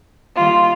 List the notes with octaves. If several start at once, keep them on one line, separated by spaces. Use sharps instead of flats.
D#3 G3 A#3 F4